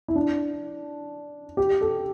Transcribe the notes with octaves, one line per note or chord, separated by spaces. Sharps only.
E4
D4
G4
A4